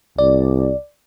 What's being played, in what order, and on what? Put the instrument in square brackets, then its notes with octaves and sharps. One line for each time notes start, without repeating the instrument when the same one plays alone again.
[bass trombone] C2 [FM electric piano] D5